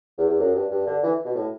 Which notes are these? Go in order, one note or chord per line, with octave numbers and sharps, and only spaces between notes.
E2
E2
F#2
G2
G2
D3
E3
B2
A2